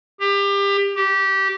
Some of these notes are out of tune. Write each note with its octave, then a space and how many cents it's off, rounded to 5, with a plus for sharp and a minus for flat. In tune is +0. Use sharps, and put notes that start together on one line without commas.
G4 +25
G4 -20